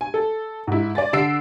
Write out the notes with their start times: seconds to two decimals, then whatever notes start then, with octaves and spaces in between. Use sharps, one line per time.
0.01 G#5
0.14 A4
0.67 G#2 E4
0.95 D5 G#5 A6
1.13 D3 E6 C7 D7